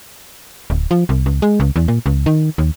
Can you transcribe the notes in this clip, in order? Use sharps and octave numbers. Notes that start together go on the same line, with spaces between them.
D1
F3
C2
C#2
G#3
C#2
E2
A#2
C#2
D#3
D#2